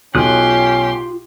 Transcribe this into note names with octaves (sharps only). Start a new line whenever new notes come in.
B1 C#4 F4 G4 C6 D#6 F#6